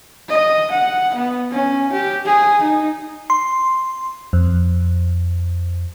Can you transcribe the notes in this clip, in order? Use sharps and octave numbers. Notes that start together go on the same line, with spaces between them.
D#5
F#5
B3
C#4
G4
G#4
D#4
C6
F2